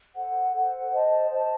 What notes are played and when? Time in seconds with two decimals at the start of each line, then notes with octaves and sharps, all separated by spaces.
0.14 A4 C5 F#5
0.52 A4 C5 F#5
0.91 C5 D#5 A5
1.30 C5 D#5 A5